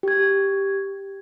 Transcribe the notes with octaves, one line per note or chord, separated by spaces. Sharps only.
G4 G#6